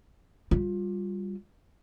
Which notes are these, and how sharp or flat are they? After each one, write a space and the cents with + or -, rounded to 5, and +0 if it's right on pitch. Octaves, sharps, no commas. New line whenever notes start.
G3 +0 F4 +20